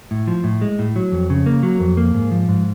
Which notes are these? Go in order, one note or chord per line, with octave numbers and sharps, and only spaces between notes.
A2
F3
A2
G#3
A2
F#3
F2
C#3
A#3
F#3
F2
A#3
G#2
F3
G#2